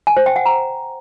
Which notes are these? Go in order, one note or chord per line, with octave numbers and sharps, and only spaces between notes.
G#5
C5
G5
F#5
A#5